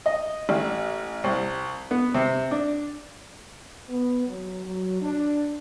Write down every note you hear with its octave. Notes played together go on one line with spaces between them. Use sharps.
D#5
A1
C2
B3
C3
D4
B3
F#3
F#3
D4